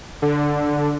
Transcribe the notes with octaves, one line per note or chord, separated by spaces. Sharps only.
D3